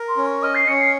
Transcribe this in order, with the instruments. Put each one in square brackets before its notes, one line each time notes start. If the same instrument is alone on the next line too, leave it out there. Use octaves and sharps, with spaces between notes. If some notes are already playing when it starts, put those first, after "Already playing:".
Already playing: [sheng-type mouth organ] A#4
[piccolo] C6
[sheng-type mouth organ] C#4
[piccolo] C#6
[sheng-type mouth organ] D#5 [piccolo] F6
[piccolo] C7
[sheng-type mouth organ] C#4 [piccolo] C#7
[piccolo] C7